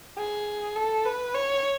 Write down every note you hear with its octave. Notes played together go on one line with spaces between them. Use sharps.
G#4
A4
B4
C#5